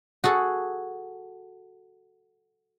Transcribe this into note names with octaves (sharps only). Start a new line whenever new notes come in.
F#4 G#4 A4